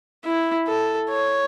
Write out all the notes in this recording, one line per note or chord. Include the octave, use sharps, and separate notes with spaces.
E4
A4
C#5